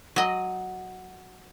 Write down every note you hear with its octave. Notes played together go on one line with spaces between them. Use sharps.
F#3 D#5